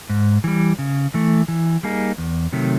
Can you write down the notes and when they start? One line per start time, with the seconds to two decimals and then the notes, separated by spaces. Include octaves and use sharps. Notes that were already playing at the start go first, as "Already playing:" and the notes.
0.10 G#2
0.44 E3 G3
0.79 C#3
1.14 E3 A3
1.48 E3
1.83 G3 A#3 D#4 G#4
2.18 E2
2.53 C3 D#3 F#3 A3